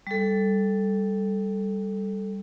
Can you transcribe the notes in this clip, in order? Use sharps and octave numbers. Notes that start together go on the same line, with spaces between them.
G3 A4